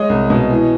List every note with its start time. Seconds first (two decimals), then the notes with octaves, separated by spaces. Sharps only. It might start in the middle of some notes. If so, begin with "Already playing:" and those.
Already playing: G#3 C#5 D#5
0.09 C2
0.30 B2
0.50 E3